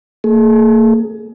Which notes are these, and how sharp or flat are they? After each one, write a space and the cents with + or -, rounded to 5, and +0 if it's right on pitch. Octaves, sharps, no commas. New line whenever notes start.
A#3 -45 G#4 +30